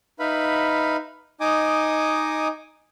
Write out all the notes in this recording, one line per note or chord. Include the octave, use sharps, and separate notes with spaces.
D#4 B4 E5 F5 B5
D#4 D#5 G#5 D6 D#6